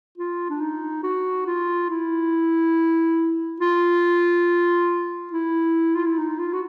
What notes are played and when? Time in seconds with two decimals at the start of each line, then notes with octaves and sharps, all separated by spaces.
0.18 F4
0.50 D4
0.61 D#4
1.03 F#4
1.47 F4
1.90 E4
3.61 F4
5.32 E4
5.96 F4
6.07 E4
6.18 D#4
6.40 F4
6.53 F#4